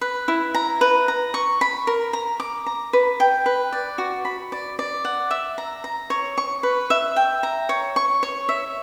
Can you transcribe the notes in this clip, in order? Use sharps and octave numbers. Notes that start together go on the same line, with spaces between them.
B4
E4
A#5
B4
A#5
C#6
B5
A#4
A#5
D6
A#5
B4
G5
B4
D5
F#4
B5
D5
D5
F#5
E5
A#5
A#5
C#5
C#6
B4
E5
G5
A#5
C#5
C#6
C#5
E5